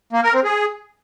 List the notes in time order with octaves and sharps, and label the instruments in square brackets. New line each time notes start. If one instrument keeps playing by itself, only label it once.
[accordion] A#3
A#4
C4
G#4